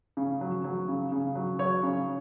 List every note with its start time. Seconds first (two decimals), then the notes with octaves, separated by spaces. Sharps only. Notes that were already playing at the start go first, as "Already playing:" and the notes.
0.17 C#3
0.41 F#3
0.64 F#3
0.88 C#3
1.12 C#3
1.35 F#3
1.59 F#3 C#5
1.83 C#3